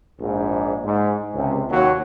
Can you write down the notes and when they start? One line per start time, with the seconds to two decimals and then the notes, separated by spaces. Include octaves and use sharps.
0.20 A#1 G#2
0.84 G#2
1.34 C#2 C3
1.70 D#2 F#3